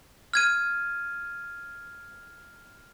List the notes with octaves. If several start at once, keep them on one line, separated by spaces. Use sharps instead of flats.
F6 G#6 D#7